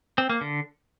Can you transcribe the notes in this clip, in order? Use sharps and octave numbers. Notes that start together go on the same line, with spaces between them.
C4
A#3
D3